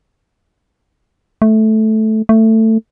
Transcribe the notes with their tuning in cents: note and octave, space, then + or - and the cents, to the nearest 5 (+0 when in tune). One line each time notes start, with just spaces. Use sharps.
A3 -10
A3 +15